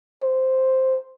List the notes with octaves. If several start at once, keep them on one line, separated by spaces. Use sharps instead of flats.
C5